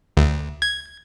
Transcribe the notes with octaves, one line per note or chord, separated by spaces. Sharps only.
D2
G#6